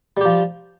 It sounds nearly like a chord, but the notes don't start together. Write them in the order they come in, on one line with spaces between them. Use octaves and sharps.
G3 G4 F3